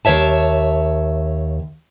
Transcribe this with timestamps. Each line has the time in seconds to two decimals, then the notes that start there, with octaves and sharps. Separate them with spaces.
0.05 D#2 C#3 C#5 E5 A5